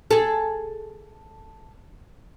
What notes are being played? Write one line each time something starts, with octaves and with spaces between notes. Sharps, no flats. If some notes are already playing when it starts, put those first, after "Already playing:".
G#4 A4